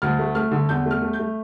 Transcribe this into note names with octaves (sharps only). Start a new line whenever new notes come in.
D2 F6
A3
A3 F6
D3
E2 G6
A3
F6
A3
G6
A3